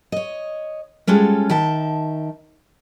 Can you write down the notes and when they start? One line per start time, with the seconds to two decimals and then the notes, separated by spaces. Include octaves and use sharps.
0.12 C#5 D#5
1.07 G3 G#3 C#4 F4 A4
1.50 D#3 E5 G5 A5